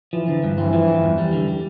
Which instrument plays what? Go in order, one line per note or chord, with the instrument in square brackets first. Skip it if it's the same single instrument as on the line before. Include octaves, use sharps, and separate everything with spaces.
[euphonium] E3 [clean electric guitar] F3
[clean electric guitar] D3
G2
[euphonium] E3 [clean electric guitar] C4
[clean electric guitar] F3
G2
E2
G3
D3
G3